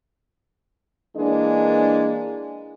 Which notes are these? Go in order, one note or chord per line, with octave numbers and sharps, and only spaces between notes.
E3 G#3 A#3 D4